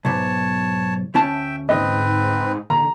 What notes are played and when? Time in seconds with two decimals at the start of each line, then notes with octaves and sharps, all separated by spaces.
0.05 B1 G#2 C#5 A5
1.14 D2 C#4 E5 G5 A5
1.69 G#2 C4 B4 D#5
2.70 D3 A#5